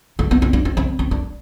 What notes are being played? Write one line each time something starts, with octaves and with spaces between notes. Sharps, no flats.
A3
B3
C4
D4
C4
C4
C4
D4